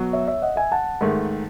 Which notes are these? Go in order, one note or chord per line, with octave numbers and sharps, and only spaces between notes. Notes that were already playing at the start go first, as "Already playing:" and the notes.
Already playing: B2 F#3 F#4
C#5 E5
C#5 E5
D#5 F#5
E5 G#5
F#5 A5
G#2 D#3 A3